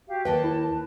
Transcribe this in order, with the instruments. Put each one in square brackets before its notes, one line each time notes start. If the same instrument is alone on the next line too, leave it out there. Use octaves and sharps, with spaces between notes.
[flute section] F#4 G4 F5
[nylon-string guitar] D#2 D#5 G5 [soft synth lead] B4 [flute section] A5
[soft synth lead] E4
[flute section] B4